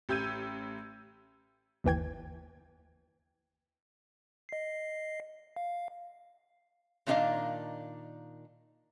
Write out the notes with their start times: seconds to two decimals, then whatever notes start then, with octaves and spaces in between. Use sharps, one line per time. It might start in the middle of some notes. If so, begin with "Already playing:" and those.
0.09 A1 G4 E6 G6 G#6 D#7
1.84 G1 D#2 E3 G5 G#6
4.49 D#5 C7
5.56 F5
7.07 A#2 D#3 D4 D#4 D#5 F5